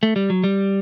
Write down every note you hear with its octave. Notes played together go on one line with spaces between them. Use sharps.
A3
G3
F#3
G3